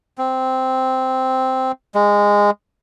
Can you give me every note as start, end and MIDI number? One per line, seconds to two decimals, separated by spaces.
0.18 1.72 60
1.95 2.50 56